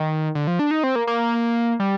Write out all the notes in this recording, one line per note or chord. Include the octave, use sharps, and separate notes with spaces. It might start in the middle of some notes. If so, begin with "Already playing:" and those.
Already playing: D#3
D3
F3
D4
D#4
C4
A#3
A#3
G3